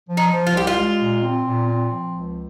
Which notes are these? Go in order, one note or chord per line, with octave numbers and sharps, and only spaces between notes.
F3
D#4
F3
F4
C2 G4
F4
G#3
A#2
C4
A#2
C4
F3
C#2